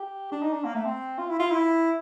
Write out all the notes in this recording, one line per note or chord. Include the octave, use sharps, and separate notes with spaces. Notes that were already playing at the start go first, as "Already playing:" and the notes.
Already playing: G4
D4
D#4
D4
A#3
A3
C4
F4
E4
F4
E4